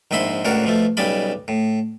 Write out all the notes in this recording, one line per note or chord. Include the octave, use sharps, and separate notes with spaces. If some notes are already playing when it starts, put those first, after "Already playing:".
A#1 G#2 D#5 E5 B5 C6
C#2 A2 D4 F#4 A#4
B2 F3 A3
B1 C#3 G3 D5 D#5 B5
A2